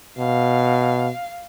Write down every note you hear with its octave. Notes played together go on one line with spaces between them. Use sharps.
B2 F5